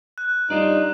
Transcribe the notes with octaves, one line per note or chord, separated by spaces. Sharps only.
F#6
G2 D4 D#4 F4 D5